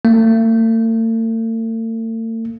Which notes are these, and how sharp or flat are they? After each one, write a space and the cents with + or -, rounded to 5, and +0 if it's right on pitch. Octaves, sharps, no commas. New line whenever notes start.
A3 +45